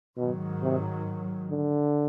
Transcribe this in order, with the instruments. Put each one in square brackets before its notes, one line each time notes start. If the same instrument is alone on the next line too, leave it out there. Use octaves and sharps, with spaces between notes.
[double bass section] G#2 D#3 F#3 [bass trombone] B2
[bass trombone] C3
D3